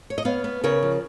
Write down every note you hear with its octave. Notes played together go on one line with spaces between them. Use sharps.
C#5
D#5
B3 C#5 F5
B3
C#3 A#4 C#5
F3